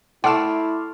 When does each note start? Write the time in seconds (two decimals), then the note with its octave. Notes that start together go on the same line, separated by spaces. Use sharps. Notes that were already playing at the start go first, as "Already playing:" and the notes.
0.24 A3 E4 D5 F#5 C6 D6 F6 E7